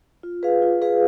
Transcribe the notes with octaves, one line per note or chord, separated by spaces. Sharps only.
F4
G#4 B4 F5
F4
G#4 B4 F5